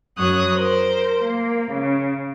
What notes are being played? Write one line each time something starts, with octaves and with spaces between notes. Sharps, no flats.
F#2 F#3 C#5 D#6 F#6
A#4 C5
A#3
C#3